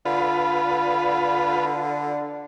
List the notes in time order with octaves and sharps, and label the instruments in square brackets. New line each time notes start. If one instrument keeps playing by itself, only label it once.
[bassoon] D3 [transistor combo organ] F4 B4